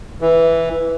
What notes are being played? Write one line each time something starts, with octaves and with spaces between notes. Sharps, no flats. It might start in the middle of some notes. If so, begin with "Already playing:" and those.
E3